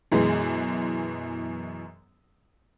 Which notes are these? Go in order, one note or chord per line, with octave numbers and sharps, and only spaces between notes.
F#2 B2 E3 G#3